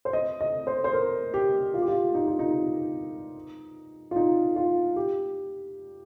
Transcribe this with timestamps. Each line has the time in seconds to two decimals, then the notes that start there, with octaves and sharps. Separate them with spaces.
0.05 C5
0.13 D#5
0.41 D#5
0.67 C5
0.84 C5
0.93 A#4
1.34 G4
1.74 F4
1.82 G4
1.88 F4
2.15 D#4
2.27 F4
2.39 D#4
4.11 F4
4.16 D#4
4.56 F4
4.96 G4